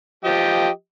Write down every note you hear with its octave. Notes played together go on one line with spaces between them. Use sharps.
F3 G4 D#5